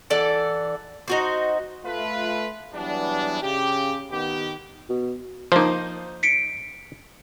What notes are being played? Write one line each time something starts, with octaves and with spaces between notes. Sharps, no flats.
E3 A4 D5 F#5
D#4 F#4 C5
A3 F4 B4
E3 F#3 G3 B3 D4
C#3 G4
D#3 B3 G4
B2
F3 A#3 D#4 C5
B6 C#7 D7